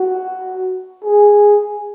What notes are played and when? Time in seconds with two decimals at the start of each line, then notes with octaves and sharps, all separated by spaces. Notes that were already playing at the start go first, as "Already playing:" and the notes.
Already playing: F#4
1.05 G#4